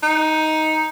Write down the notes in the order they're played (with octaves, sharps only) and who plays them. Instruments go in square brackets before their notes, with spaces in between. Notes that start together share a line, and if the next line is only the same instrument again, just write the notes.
[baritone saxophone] D#4